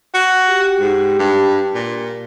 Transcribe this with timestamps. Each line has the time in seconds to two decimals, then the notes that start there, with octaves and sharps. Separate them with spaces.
0.14 F#4
0.48 G4
0.80 G#2
1.19 G2
1.74 A#2